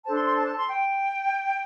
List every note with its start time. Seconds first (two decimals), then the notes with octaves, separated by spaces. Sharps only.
0.04 D4 A4 C5 A5
0.15 C6
0.25 C6
0.36 A5
0.47 A5
0.58 C6
0.68 G5